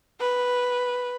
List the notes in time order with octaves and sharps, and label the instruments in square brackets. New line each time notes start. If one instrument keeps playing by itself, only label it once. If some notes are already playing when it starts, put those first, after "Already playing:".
[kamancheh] B4